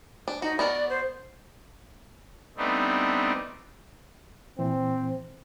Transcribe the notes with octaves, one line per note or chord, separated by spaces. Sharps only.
D4
D#4 F#4
B3 F#4 A#4 D5
C5
G3 A3 B3 C4 D4 D#4
A#2 E3 C4